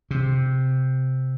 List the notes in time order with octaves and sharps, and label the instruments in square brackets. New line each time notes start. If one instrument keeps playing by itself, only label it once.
[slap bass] C3